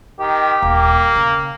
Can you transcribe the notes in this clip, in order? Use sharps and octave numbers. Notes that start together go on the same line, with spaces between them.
D#3 G4
D#1 A#3
C#3